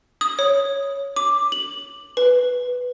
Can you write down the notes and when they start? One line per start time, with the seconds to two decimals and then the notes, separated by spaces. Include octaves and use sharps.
0.21 D#6
0.39 C#5
1.16 D6
1.52 F#7
2.17 B4